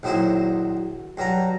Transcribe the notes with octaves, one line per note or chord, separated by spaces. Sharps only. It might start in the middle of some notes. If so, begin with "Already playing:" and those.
A#1 D#3 F#3 E4 C5
G2 F#3 A#5